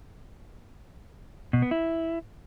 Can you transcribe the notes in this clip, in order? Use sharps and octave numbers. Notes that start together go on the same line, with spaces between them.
B2
B3
E4